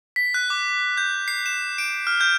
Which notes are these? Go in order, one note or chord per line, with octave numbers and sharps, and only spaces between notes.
B6
F#6
D6
G6
C7
E7
D7
F6
G6